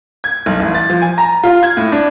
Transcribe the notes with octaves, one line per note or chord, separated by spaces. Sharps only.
G#6
B1
A1
A6
F3
G#5
A#5
F4
G#6
A2
D4